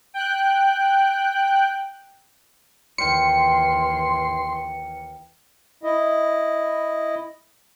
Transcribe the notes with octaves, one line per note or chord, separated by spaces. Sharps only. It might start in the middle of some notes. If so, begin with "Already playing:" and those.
G5 F#6
D#2 E3 F5 G5 C6 C#7
E4 D#5